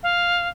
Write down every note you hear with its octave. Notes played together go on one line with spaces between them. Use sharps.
F5